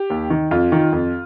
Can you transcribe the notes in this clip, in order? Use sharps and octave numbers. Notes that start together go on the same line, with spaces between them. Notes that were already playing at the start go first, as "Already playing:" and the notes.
Already playing: G4
D#2
D#3
F2 F4
D#3
F2